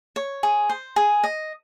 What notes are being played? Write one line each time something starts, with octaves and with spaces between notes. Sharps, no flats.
C#5
G#4
C5
G#4
D#5